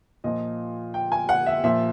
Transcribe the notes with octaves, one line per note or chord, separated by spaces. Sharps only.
A#2 F3 D#5
G5
G#5
F#5
E5
A#2 F3 E5